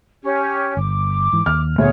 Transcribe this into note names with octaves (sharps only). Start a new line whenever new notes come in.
C#4 G4
G1 D6
G#2 E3
D#2 F6
D2 A#2 B3 G#4 C#5